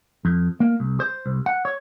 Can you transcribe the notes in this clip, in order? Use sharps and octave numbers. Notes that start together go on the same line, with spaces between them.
F2
A#3
C2
C5
C2
F#5
C#5